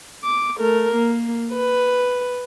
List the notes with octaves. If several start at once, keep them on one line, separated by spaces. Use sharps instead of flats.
D6
A3 A#4
A#3
B4